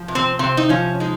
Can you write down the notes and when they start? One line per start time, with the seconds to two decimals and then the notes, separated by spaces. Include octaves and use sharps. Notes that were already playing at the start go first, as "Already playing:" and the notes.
Already playing: F3
0.08 C3
0.15 C4
0.39 C3 C4
0.57 D#4
0.69 F3 C#4
1.00 G#3 D#4